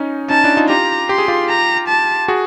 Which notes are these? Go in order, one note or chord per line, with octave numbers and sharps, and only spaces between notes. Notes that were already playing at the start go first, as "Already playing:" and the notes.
Already playing: C#4 D#4
C#4 D#4 A5
D4 E4
D#4 F4
F4 G4 A#5
G4 C6
G#4
F4 G4
A#5
A5
F#4 G#4